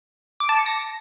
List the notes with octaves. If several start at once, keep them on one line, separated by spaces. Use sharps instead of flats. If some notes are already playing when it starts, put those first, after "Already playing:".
D6
A5
C#7
A#6